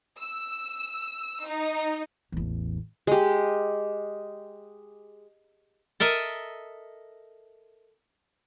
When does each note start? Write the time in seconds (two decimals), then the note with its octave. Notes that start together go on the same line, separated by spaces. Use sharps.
0.19 E6
1.45 D#4
2.32 A1 E2
3.07 G#3 G4
6.00 A4 A#4 D#5 E5